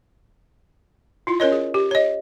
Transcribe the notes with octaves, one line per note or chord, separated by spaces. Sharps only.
E4 F4
C#4 A#4 C#5 D#5
G#4
G4
C#5 D#5